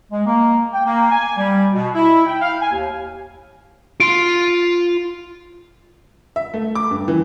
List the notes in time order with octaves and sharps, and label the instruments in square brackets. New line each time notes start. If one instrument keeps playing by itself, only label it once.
[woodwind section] G#3
A#3
G5
A#3
G#5
G3
B2
E4
G5
F5
G#5
D#2
[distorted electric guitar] F4 C6 [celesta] D7
[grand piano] E5
A3
D6
G2
E3